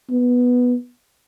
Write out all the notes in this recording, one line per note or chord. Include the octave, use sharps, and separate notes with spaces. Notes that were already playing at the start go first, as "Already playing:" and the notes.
B3